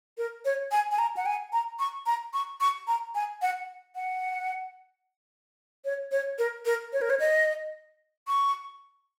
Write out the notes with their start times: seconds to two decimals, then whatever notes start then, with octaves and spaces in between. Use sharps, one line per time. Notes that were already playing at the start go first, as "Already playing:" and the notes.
0.18 A#4
0.45 C#5
0.72 G#5
0.92 G#5
0.99 A#5
1.17 F#5
1.26 G#5
1.53 A#5
1.79 C#6
2.06 A#5
2.34 C#6
2.61 C#6
2.87 A#5
3.15 G#5
3.42 F#5
3.95 F#5
5.85 C#5
6.12 C#5
6.39 A#4
6.65 A#4
6.93 C#5
7.01 A#4
7.10 C#5
7.20 D#5
8.28 C#6